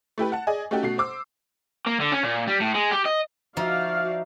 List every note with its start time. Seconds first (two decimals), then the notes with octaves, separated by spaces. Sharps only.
0.18 A3 E4 G4 B4
0.32 F#5 A5
0.47 G#4 D5 D#5 G#5
0.71 A3 C#4 D#4 F#4 G4 A4
0.83 B2 A3 F#4 C7
0.98 C5 D6 E6
1.87 A#3
2.00 D3
2.12 C#4
2.23 A#2
2.47 G3
2.60 A2
2.74 G#3
2.91 G4
3.05 D#5
3.57 F3 D#4 F#4 D5 E5 F5 F6